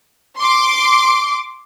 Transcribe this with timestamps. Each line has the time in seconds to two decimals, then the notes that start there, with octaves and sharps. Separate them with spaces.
0.40 C6 D6